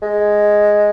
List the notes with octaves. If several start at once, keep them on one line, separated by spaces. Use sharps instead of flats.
G#3